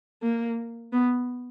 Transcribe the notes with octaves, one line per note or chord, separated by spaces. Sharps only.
A#3
B3